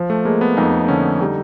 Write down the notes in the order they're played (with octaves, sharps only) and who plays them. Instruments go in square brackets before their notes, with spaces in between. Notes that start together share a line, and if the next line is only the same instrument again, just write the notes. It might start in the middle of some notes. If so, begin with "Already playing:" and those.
Already playing: [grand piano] F3
[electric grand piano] A3
[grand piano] G#3 [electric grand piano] A#3
[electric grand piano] B3
[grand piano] F2 [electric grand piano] D#4
[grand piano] D3 [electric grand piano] C#4
[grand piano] G3 [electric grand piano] D#4